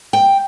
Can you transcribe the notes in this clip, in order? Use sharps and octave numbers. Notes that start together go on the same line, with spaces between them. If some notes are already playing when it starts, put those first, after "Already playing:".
G5